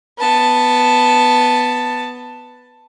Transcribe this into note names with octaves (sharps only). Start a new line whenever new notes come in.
B3 A5